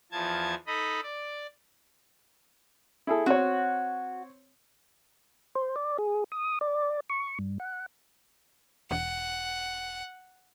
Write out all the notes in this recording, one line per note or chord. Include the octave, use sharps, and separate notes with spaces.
E2 F3 A5 G#6
D#4 A4 D#5 B5
D5
E4 G#4 A4
C4 F#4 C#5
C5
D5
G#4
D#6
D5
C#6
G2
F#5
E1 F#5